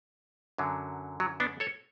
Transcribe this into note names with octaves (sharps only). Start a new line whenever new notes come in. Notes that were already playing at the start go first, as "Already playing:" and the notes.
F#2 D3 F#3
F#3
B3 D4
A4 C#5